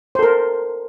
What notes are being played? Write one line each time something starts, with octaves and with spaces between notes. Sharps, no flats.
A4 A#4 C5